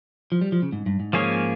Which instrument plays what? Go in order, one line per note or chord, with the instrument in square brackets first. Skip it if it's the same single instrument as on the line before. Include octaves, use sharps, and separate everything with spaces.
[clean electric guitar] F3
G3
F3
C#3
G#2
G2
G#2
[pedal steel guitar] F3 A#3 C#4 G#4 C#5